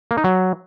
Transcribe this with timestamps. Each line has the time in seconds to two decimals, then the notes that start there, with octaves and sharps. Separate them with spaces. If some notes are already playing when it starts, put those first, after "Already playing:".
0.11 A#3
0.17 D#4
0.24 F#3